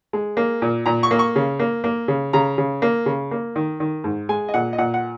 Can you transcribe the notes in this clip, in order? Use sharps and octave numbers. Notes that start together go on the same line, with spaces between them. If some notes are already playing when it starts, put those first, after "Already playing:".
G#3
A#3
A#2
A#2 A#5
C#6
A#3
C#6
C#3
A#3
A#3
C#3
C#3 A#5
C#3
A#3
C#3
A#3
D#3
D#3
G#2
G#3 G#5
D#5
A#2 F#5
D#5
A#2 F#5
F#5